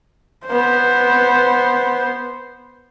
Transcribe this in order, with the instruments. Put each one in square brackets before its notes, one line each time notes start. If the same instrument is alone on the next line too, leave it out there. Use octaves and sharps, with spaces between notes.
[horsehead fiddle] B3 C5